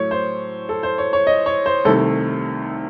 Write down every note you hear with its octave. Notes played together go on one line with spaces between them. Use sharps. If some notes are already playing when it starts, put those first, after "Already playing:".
Already playing: A2 F#3 A3 C#5
C5
A4
C5
C#5
C#5
D#5
C#5
C5
C2 C3 D#3 A3 A4